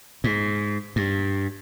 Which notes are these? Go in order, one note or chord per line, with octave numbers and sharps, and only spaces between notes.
G#2
G2